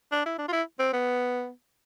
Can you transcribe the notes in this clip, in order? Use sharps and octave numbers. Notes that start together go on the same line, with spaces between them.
D4
E4
D4
F4
E4
C4
B3